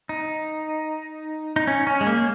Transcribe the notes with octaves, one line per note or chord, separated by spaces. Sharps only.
D#4
D#4
C#4
C#4
G#3
A#3